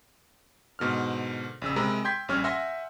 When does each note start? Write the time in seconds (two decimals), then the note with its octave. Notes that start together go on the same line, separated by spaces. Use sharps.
0.79 G#2 B2 D3 F6
1.62 A#1 C#3 E6
1.76 C3 G#3 A#4 A#5 B5
2.05 G5 C6 G6 G#6 B6
2.29 A#1 G3 C#4 C#5 F6
2.44 E5 F#5 G#5 C6 A#6